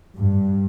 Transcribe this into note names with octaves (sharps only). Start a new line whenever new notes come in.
G2